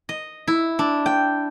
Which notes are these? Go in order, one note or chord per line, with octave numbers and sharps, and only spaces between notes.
D#5
E4
D4
G5